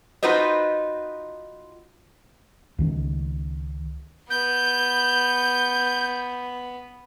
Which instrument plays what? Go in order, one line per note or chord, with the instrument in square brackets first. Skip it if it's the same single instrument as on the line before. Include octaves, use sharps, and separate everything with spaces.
[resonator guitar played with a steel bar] D#4 F4 F#4 B4 C5 D#5
[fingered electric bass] C#2 D#3 C#4
[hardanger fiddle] B3 [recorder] G6